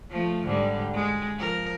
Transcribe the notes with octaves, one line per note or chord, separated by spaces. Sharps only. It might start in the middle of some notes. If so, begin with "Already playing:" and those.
F3 A3
G#2 D3 G3
G#3
F3 A#4